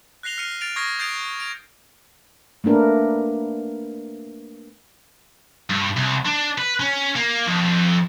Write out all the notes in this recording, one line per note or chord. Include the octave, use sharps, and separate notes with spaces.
F#6 A#6 C7 F7 G7
F6 C7 C#7 D#7
F6 A6 D7 F7
C#6 D#6 F6 G#6 A#6 C7
D#6 G6 A6 C7 D7 F7
D7 F7
A3 A#3 D4 A#4 B4
G2
C2
D4
B4
C#4
A#3
F2